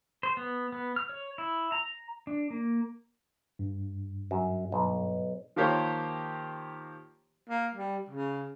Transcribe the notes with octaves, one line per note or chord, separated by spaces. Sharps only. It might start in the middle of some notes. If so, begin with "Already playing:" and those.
C5
B3
B3
F6
C#5
E4
A#5
D4
A#3
G2
F#2
B1
D#3 F3 A#3 G4 C5 C#5
A#3
G3
C#3